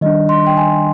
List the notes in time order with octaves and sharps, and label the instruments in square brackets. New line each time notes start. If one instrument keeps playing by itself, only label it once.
[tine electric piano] D#3 G3 D4 [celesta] D#5
[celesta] C6
G5
G#5